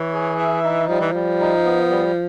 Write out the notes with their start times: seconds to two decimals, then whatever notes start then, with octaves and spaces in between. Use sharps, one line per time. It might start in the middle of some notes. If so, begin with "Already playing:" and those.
Already playing: E3 C#5
0.13 G#4
0.39 E5
0.64 D#4
0.88 F3 G3
1.01 E3
1.12 F3 G3
1.40 D#4
1.65 B3
1.90 G3